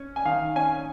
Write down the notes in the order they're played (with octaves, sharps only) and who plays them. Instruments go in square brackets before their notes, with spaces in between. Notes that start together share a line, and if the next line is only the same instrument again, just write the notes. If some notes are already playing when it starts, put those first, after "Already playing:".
Already playing: [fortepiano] C#4
G#5
D#3 F5
C#4 G#5